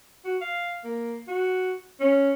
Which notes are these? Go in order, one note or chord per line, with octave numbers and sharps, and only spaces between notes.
F#4
F5
A#3
F#4
C#4